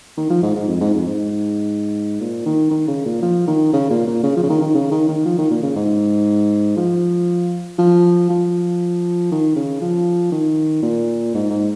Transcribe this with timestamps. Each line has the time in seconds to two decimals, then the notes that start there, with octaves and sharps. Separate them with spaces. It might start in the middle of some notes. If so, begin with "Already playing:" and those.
0.17 D#3
0.30 F3
0.43 G#2
0.55 G#2
0.68 F2
0.81 G#2
0.94 F2
1.07 G#2
2.21 A#2
2.46 D#3
2.71 D#3
2.88 C#3
3.05 A#2
3.22 F3
3.47 D#3
3.73 C#3
3.90 A#2
4.07 A#2
4.23 C#3
4.36 F3
4.43 C#3
4.49 D#3
4.61 D#3
4.75 C#3
4.91 D#3
5.09 D#3
5.25 F3
5.38 D#3
5.51 A#2
5.63 C#3
5.76 G#2
6.77 F3
7.78 F3
8.30 F3
9.32 D#3
9.56 C#3
9.82 F3
10.32 D#3
10.83 A#2
11.34 G#2
11.50 G#2